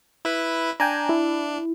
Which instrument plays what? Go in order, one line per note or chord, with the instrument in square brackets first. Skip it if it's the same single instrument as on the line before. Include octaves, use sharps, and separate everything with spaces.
[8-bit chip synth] E4 B4
[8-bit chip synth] D4 [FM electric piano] G5 G#5 A#5
[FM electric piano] E4